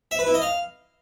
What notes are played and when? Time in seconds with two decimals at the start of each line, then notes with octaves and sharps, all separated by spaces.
0.11 E5
0.19 B4
0.26 E4
0.34 D#5
0.42 F5